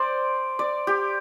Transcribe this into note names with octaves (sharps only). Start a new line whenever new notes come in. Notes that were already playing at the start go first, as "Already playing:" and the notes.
Already playing: C5 D5
D5
G4